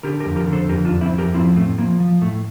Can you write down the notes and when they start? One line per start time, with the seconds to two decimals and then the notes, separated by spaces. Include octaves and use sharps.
0.03 D3 G4 A#4
0.20 G4 A#4
0.26 F2
0.36 G4 A#4
0.47 D3
0.53 A4 C5
0.69 F2 G4 A#4
0.85 D4 F4
0.91 F2
1.01 C4 E4
1.13 F2
1.18 G4 A#4
1.34 F3 C4 E4
1.56 A2 A3 C4
1.78 F3 A#3
2.00 F3
2.22 A2 A3